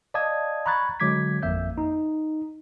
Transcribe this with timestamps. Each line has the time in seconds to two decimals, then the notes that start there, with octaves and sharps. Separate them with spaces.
0.14 D5 D#5 F5 A5 D#6 G#6
0.66 A#5 B5 C#6 F#6 G#6 A6
1.00 D3 F#3 G#3 D6 G#6 B6
1.42 G#1 F2 A#3 E5 G6
1.78 D#4